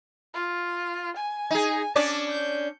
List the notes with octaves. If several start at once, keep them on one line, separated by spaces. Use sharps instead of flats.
F4
G#5
D#4 G#4
C#4 D4 D5 A5
G6